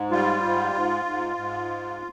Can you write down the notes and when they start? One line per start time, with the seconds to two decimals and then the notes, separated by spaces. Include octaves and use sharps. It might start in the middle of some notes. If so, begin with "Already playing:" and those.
Already playing: G#2
0.11 G3 F4
0.43 G#2
0.74 G#2
1.05 G#2
1.37 G#2